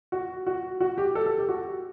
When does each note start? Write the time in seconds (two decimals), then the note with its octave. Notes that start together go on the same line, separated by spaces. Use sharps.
0.12 F#4
0.47 F#4
0.80 F#4
0.98 G4
1.15 A4
1.26 A4
1.38 G4
1.49 F#4